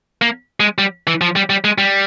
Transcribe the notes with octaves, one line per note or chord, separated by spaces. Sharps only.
A#3
G#3
G3
E3
F3
G3
G3
G#3
G3